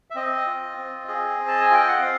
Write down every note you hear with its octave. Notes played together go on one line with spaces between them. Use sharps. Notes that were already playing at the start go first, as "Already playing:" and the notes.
E5
C4 D#5
F4
C4
G#4 D#5
C4
A5
G#5
F4 G5
F#5
C4 F5